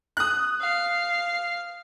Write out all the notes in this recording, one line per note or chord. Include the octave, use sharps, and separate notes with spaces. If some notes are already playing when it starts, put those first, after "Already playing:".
D#6 F#6
F5